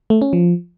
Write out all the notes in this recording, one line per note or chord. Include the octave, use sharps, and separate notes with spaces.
A3
C#4
F3